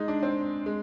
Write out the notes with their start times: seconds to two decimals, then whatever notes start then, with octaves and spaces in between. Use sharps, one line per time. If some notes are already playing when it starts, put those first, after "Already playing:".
Already playing: G#3 D#4
0.08 D4
0.23 C4
0.66 G#3